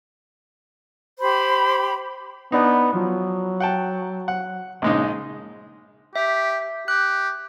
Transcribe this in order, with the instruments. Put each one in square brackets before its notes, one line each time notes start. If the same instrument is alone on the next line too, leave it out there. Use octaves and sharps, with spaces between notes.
[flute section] G4 C5 B5
[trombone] B3 [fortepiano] D4 D#4
[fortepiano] F3 [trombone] F#3
[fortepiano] F#5 G5 A5
F#5
[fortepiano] A#1 G#3 D#4 [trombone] C#3
[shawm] G4 [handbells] E5
[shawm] G4 [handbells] F#6